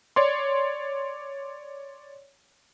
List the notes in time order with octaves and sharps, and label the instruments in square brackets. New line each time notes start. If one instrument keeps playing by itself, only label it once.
[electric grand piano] C#5 D5 C6